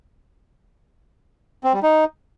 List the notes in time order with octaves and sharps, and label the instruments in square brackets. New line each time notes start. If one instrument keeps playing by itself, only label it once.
[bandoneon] C4
G3
D#4